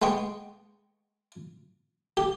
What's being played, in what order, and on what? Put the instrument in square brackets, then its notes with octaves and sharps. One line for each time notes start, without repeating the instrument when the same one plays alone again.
[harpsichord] G#3 B3 G5 C#6
G4